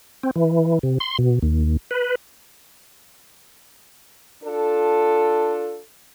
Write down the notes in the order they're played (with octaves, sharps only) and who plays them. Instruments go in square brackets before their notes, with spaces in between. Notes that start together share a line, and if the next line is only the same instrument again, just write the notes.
[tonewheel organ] C4
E3
C3
C6
B2
D#2
B4
[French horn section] D4 F4 A4